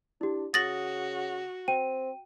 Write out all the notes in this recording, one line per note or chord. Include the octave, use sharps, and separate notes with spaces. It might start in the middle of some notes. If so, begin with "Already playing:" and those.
D4 E4 G4
C#3 F#4 D#6 A6 A#6 F#7
C4 G5 D#7